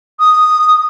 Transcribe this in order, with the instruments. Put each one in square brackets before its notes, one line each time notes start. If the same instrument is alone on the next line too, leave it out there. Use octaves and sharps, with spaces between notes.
[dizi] D#6